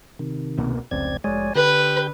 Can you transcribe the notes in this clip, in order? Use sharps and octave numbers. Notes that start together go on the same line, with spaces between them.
C3 D#3
C2 B2 A#3
F1 C#2 C4 D5 G#6
F1 G#3 C#5 D5 G#5
D3 G4 B4 G6